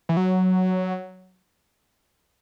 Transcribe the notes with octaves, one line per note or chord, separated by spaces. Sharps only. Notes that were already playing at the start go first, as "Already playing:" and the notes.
E3
F#3